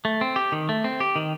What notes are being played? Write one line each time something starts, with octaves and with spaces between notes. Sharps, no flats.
A3
C4
G4
D#3
A3
C4
G4
D#3